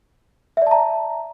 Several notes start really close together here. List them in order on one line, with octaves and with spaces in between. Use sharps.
E5 D5 A5 A#5